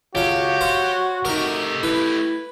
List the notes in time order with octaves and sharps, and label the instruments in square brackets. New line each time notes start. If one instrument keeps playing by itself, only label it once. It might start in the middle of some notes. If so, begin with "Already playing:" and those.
[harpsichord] C#2 F5 [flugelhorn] F#4 [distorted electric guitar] G4 [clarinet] C#5
[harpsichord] C5 F5
[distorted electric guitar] A3 G4 [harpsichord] D#4 A#4
[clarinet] E4 [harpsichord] B4